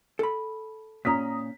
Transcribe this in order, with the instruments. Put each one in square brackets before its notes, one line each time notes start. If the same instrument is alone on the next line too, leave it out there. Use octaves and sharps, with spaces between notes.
[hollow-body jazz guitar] A4 B5
[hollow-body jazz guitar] A#2 C#4 [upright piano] A#5 D#6 B6